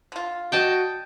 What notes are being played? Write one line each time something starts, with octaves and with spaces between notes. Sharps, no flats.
D3 F4
F#4 D5 D#5 G5 A5